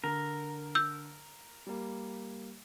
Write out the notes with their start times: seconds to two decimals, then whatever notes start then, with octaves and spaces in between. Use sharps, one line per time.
0.04 D3 A#4
0.75 E6 G6
1.67 G3 A#3